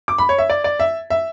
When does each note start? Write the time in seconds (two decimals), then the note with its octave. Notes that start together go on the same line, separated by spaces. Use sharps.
0.08 D6
0.18 B5
0.29 C#5
0.38 E5
0.50 D5
0.64 D5
0.80 E5
1.10 E5